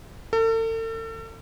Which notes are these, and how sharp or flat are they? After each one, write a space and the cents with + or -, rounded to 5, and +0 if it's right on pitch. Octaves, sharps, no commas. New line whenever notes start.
A4 +40